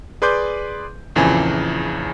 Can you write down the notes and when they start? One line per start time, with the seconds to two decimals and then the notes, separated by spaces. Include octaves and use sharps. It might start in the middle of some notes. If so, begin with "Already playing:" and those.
0.22 G#4 B4 D5 C6 D6 G6
1.16 A#1 F2 C#3 E3 G#4 G#5